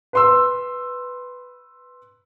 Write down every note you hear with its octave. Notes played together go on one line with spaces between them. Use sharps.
B4 C6 E6